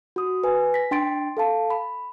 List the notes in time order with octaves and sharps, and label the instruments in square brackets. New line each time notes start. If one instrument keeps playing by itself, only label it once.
[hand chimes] F#4 D#6
B4 G#5
A#6 B6
D4 G5 C6 A6 D7
A4 F5 A5
B5